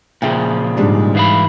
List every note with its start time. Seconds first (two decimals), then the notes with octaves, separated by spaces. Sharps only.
0.22 A#2 C#3 F3 G#4 E5 G5
0.77 G#2 G3 G#3 D4
1.15 E3 F5 B5